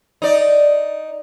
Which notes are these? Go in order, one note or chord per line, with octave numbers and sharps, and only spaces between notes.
D#4 D5